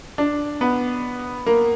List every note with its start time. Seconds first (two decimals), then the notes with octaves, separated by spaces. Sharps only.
0.18 D4
0.61 B3
1.46 A#3